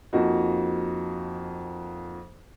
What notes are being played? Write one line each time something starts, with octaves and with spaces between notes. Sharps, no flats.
F2 F3 A#3 D#4 F#4